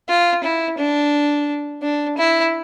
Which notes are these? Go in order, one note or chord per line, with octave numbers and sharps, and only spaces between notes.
F4
E4
D4
D4
E4